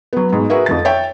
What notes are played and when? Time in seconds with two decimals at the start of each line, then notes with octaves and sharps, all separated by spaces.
0.13 F#3 B3
0.33 G#2 B2
0.50 F#4 G#4 A#4 B4 E5
0.66 F2 F3 A6
0.85 C#5 E5 G5